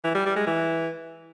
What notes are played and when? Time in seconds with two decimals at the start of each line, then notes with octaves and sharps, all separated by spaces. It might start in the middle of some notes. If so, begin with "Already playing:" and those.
0.04 E3
0.15 G3
0.26 G3
0.36 G#3
0.47 E3